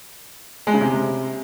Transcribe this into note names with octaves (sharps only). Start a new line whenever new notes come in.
G#3
C#3
C3